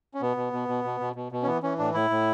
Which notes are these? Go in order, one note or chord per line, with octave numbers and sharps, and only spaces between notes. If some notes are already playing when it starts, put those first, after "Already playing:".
C#4
B2 B3
B2
B2
B2
B2
B2
B2
B2
C#4
E3 B3
E3 C#4
A2 D4
A2 E4
A2